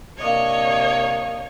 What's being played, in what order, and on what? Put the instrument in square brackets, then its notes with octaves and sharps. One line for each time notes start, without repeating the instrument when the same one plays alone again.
[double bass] C3 D4 [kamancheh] A#3 D#5 [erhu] C#5